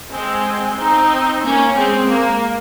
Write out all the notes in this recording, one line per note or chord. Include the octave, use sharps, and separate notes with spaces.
G#3 C4
C4 D#4
A#3 C#4
G#3 C4
A#3